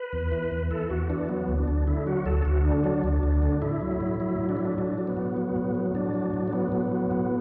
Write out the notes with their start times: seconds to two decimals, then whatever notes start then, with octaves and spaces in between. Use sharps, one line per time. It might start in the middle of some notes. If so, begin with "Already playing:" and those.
Already playing: B4
0.13 E2
0.32 E3
0.51 E2
0.71 E3 A4
0.90 E2 F#4
1.09 E3 D4
1.29 F#3 B3
1.48 D2
1.58 D4
1.68 D2
1.87 D3 E4
2.07 F#3 F#4
2.26 D2 A4
2.45 D2 F#4
2.65 D3 D4
2.84 F#3 D4
3.04 D2
3.23 D2
3.42 D3
3.62 A2 E4
3.81 F#3
4.01 A2
4.20 F#3 E4
4.39 A2
4.49 D4
4.57 F#3 E4
4.65 D4
4.78 A2 D4
4.98 F#3
5.07 B3
5.17 A2
5.37 F#3
5.56 A2
5.75 F#3
5.94 A2 D4
6.14 F#3
6.34 A2
6.47 D4
6.53 F#3 B3
6.72 A2
6.92 F#3
7.11 A2